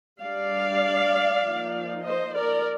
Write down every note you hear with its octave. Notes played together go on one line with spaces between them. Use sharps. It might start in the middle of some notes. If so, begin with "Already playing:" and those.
G3 D4 D5 F5
F3 A#3 D#4
C5 D#5
A#4 D5